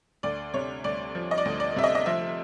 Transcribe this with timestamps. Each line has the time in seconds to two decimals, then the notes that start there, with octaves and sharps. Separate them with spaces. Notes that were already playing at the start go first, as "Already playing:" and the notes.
0.23 D2 D5
0.54 C3 C#5
0.84 D2 D5
1.15 F3
1.31 D#5
1.38 D5
1.45 D2
1.60 D5
1.76 C3 E5
1.84 D#5
1.95 D#5
2.06 F3 E5